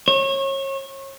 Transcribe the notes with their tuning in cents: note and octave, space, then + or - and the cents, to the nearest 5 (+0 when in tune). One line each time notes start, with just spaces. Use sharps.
C#5 -30